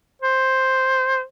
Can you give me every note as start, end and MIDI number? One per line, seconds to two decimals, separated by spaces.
0.22 1.23 72